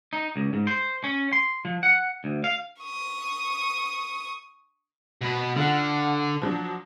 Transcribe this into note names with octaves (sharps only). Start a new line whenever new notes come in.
D#4
C#2
G#2
C5
C#4
C6
F3
F#5
D2
F5
C#6 D#6
B2 B4
D3 F4 A4 F#5
F3 F#3 D4